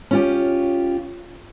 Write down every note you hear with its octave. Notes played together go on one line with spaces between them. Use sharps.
C#4 F4 G4